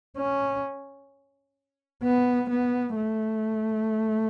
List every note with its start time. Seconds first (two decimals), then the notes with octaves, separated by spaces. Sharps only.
0.18 C#4
2.04 B3
2.50 B3
2.96 A3